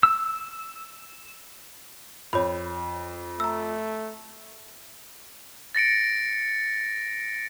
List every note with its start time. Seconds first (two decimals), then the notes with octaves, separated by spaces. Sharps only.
0.03 E6
2.33 F2 C#5 B5
3.40 A3 A#5 E6
5.75 A6 A#6 C#7 D7